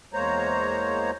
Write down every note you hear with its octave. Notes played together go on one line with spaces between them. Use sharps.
E2 G#3 A#3 C5 C#5 A#5